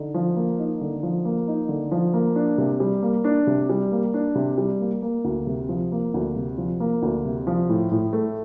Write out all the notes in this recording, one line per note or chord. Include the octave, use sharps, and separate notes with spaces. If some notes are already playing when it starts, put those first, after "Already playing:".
Already playing: D3 D#4
F3
A#3
D#4
D3
F3
A#3
D#4
D3
F3
A#3
D4
C3
G3
A#3
D4
C3
G3
A#3
D4
C3
G3
A#3
A#3
D2
C3
F3
A#3
D2
C3
F3
A#3
D2
C3
F3
A2
A2
A3